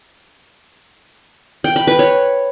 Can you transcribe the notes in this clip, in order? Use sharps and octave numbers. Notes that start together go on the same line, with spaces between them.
G5
B5
B4
C#5